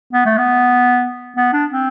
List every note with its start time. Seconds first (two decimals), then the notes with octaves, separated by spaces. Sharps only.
0.13 B3
0.25 A3
0.38 B3
1.37 B3
1.53 D4
1.70 C4